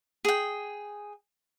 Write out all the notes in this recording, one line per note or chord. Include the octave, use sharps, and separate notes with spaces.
G#4 G5